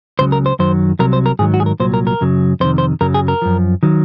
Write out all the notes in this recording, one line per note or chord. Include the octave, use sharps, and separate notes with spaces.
C#2 C#3 F#3 C5
A#4
C5
F#2 D#3 F#3 C5
C2 C3 F#3 A#4
C5
A#4
G#2 D#3 F#3 G#4
F#4
G#4
A#4
C2 A#2 F#3 C5
A#4
A#4
F#2 C#3 F#3
F2 C3 D#3 C5
C5
F#2 C#3 F#3 A#4
G#4
A#4
F#2 F3
D#3 F#3